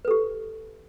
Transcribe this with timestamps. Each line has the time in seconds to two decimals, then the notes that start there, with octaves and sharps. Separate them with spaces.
0.05 B4
0.08 A4
0.11 G4